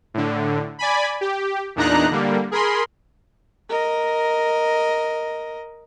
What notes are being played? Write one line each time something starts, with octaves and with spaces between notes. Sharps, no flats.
A2 D3
D5 G#5 B5
G4
E2 A#2 D4 D#4 A#5 F#6
D3 G3 A#3
G#4 A#4 B5 C6
A#4 D#5